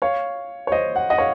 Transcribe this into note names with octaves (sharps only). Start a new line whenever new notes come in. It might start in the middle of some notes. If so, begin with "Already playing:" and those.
C#5 F5
C#5
C5 D#5
F#5
D#5 F#5
C#5 F5